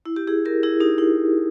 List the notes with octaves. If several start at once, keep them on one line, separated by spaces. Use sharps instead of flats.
E4
G4
E4 G#4
G4 A#4
E4 G#4
D#4 G4
E4